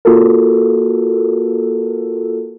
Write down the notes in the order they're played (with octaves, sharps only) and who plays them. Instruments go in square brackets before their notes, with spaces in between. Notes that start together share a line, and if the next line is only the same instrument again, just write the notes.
[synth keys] A#3 F4 F#4 A4 A#4